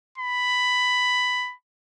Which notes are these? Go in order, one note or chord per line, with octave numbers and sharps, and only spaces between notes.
B5